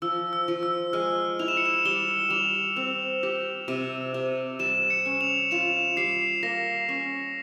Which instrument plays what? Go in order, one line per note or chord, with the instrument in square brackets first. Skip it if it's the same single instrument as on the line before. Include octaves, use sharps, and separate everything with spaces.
[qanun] F3 [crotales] E6
[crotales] E6
[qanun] F3
[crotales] E6
[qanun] G#3 [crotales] F6
[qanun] E4 [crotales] F7
[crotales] E7
C#7
E7
[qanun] G3 [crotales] G7
[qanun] G3 [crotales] F7
[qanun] C4
G4
C3
C3
[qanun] G3 [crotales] E7
[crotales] C#7
[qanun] C#4
[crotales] F7
[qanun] F4 [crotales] E7
[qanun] G3 [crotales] C7
[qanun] A#3 [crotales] A#6
[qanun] C#4